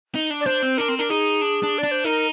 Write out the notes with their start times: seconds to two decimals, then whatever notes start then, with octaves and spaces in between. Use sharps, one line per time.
0.15 D#4
0.30 D4
0.41 D5
0.46 D4 C5
0.62 C4
0.78 D4 A#4
0.89 C4
0.98 D4 A#4
1.10 D#4 G#4
1.41 D4
1.63 D4
1.78 D5
1.84 D4
1.91 C5
2.04 D#4 A#4